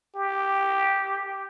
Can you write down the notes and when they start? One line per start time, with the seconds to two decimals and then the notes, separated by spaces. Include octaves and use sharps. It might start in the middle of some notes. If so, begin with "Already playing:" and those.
0.15 G4